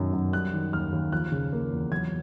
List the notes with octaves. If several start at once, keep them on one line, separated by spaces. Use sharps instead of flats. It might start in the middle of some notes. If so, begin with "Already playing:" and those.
Already playing: F#2 B2 D#3 F#3
F#2
G3 F#6
D#3
D#2 F6
D#2
F3 F#6
C#3
A#3
E2
F#3 G#6